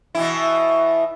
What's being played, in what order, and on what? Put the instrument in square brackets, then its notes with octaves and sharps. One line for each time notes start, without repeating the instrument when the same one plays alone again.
[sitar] B2 E3 E4